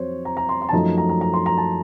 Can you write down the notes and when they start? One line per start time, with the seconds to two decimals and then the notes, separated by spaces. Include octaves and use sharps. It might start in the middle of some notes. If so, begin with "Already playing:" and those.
Already playing: F2 F#3 C4 C5 C#5
0.25 A#5
0.37 A#5
0.49 C6
0.62 C6
0.69 A5
0.73 F#2 F3 A3 D#4 A#5
0.98 A#5
1.09 A#5
1.21 A#5
1.34 C6
1.46 A#5
1.58 A5